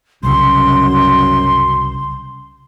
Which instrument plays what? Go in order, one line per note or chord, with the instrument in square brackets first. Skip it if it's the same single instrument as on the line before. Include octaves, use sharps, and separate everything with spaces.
[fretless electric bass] C2 C#3 [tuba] F#2 [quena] C6